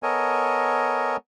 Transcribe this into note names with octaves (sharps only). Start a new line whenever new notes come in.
B3 A4 A#4 C#5 D#5 G#5